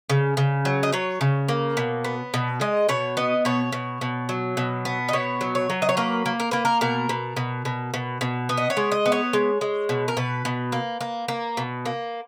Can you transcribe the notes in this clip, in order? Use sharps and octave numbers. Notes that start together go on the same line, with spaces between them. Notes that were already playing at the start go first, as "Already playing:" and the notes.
C#3
C#3
F#3
D#5
F#3 C#5
C#3
A#3
B2
B3
B2
G#3 D#5
B2 C#5
B3 D#5
B2 C#5
B2
B2
F#3
B2
B3
D#5
B2 C#5
F#3
C#5
F#3
D#5
C#5
A#3 B4
A#3
A#4
A#3 B4
A#4
B2 A#4
B2
B2
B2
B2
B2
B3
D#5
C#5
G#3
D#5
B3
C#5
G#3
G#3
B2
A#4
B2 B4
B2
A#3
A#3
A#3
B2
A#3